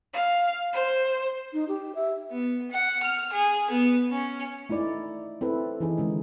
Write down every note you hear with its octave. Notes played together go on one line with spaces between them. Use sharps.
F5
C5
D#4
G4
E5
B3
F#5
F6
G#4
B3
C#4
A3 D#4 E4 D5
C4 E4 A4 B4
E3 D#4 G#4
D3 G#3 C#4